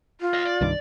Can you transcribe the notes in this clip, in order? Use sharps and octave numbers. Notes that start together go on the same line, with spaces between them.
F4
D#5 F5
D5
C2 G2 D#3